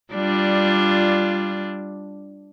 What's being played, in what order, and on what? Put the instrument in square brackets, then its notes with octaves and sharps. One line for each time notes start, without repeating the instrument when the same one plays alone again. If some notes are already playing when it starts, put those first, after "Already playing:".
[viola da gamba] G3 D4 F4